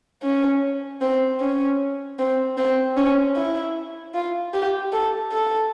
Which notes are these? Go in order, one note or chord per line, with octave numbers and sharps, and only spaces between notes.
C#4
C4
C#4
C4
C4
C#4
E4
F4
G4
A4
A4